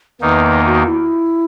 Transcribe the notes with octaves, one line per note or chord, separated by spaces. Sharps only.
E2 D#3 A#3 D#4 B4
F#4
E4